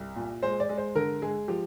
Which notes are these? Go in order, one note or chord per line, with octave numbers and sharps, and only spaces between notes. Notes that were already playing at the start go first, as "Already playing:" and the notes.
Already playing: C2
A#2
G#3 C5
D5
G#3
C5
D3 A#4
G#3 G#4
F3 G4